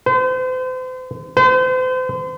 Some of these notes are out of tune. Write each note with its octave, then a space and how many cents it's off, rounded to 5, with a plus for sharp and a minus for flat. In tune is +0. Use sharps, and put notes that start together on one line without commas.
C5 -40
C5 -40